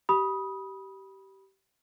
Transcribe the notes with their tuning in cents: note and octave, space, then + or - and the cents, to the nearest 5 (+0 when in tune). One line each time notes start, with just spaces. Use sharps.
G4 -20 B5 -20 D#6 +10